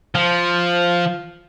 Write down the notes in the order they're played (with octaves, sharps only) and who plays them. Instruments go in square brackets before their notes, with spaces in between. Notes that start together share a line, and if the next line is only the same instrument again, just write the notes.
[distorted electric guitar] F3